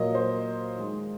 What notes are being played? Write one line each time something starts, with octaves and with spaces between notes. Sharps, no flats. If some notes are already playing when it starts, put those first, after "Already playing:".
Already playing: A#2 F#3 A#3 D#5
C5
D#3 G#3